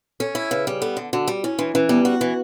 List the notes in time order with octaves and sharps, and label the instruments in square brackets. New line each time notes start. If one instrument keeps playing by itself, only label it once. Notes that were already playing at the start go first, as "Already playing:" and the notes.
[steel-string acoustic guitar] C#4 [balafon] A4
[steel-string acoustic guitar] E4
[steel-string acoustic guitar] C#3 [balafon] B4
[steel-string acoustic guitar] G3
[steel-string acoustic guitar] B3 [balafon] A4
[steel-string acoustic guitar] D3
[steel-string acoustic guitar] D3 [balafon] F#4
[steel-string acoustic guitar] G3
[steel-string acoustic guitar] C#4 [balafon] E4
[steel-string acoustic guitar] E3 [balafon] D4
[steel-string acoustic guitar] E3 [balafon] C#4
[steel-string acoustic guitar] G3 [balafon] B3
[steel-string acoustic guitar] F#4
E3